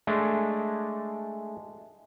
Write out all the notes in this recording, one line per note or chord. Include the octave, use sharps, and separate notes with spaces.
G#3 A3 D4